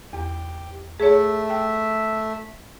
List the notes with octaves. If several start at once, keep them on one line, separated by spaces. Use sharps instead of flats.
E2 G4
A3 G#4 C#5 E5
G5